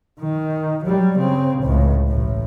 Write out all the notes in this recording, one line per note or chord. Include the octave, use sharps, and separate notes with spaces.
D#3
F#3 G3
C#3 C4
C#2 A2
A1 A2